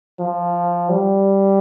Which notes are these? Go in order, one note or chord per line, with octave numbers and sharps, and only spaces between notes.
F3
G3